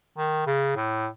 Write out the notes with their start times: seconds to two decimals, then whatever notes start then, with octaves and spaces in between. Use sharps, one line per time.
0.18 D#3
0.46 C#3
0.76 A2